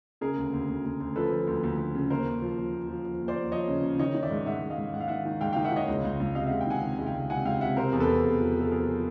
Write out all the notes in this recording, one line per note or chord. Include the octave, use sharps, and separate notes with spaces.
C#3 G#4 A#4
D2
D2
D2
D2
D2
F3 A4 B4
F3
D2
D2
D2
C#3
D#2 A#4 C5
D#2
F3
F3
D#2
F3
F3
D#2
C5 D5
D#2
F3 C#5 D#5
C#3
C#3
D#3 C#5 D#5
D#3
D5 E5
G#2
G#2 E5 F#5
G#2
D#5 F5
G#2
G#2 F#5
F5
D#3 E5 F#5
D#3
G#2 F5 G5
D#3 F5 G5
E5 F#5
D#3 C#5 D#5
C#2
C#2
C#2
C3 D#5 F5
C#2 E5 F#5
G5
D#3 F#5 G#5
C3
C#2
F5 G5
C#2
C3 F#5 G#5
C#2 F5 G5
C3 E5 F#5
C3 A#4 C5
E2
A4 B4
C3
E2
F3
F3 A4
F3 G#4 A#4
F3